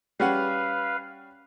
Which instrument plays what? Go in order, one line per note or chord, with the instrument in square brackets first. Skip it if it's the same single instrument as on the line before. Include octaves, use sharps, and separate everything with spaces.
[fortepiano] G3 C#4 F#5 [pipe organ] B4 F5